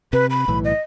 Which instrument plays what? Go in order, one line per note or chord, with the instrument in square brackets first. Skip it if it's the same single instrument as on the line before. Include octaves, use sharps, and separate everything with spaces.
[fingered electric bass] C3 [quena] B4
[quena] B5
[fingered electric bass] B1 A2 E3
[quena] D#5